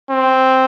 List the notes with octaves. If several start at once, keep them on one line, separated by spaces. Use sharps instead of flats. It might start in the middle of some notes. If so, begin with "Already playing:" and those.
C4